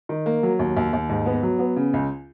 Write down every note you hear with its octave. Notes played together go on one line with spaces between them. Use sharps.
D#3
A#3
F#3
D#2
D#2
D#2
G#2
B3
F#3
B3
C#3
C#2